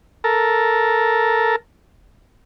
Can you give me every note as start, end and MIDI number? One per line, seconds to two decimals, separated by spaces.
0.24 1.56 69
0.24 1.56 70